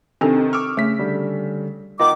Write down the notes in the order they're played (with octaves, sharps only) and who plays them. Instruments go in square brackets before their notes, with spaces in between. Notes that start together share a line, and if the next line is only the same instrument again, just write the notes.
[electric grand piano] C3 D#3 [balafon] C4 D4 A4
[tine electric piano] C#6 [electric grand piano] D6 E6 F6
[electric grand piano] C#3 B6 [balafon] A3
[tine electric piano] D3 G3
[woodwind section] D#3 B3 D6 [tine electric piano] F4 D#5